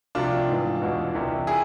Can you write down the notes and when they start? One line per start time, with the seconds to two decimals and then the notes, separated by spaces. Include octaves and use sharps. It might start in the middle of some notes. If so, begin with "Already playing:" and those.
0.15 C2 C3 F3 D4 F4
0.49 G#2 E3
0.82 E2 B2
1.14 C2 C3 E3
1.47 E4 G#4